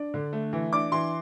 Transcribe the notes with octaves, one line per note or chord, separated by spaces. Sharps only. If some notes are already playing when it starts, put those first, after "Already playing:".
Already playing: D4
D3
A3
E3
D4 D6
E3 C6